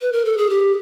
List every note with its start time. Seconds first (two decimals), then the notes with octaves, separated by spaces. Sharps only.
0.01 B4
0.13 A#4
0.25 A4
0.38 G#4
0.50 G4